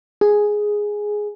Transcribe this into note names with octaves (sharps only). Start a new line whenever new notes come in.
G#4